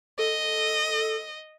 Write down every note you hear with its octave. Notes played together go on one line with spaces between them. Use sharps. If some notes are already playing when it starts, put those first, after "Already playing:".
A4 D#5